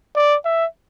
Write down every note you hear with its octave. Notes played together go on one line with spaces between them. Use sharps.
D5
E5